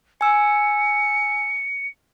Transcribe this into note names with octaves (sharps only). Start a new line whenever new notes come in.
G#5 E6 C#7